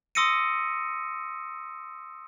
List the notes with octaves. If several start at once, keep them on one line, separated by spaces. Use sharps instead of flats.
C6 D#6 E6 A#6 C#7 D#7